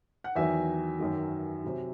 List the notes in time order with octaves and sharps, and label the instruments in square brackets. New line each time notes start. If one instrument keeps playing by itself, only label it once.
[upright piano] F#5
E2 D#3 F#3 E5 G#5
F#2 D#3 F#3
C3 F#3